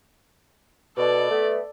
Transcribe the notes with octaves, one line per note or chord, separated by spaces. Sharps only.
B2 A4 D5
A3 B3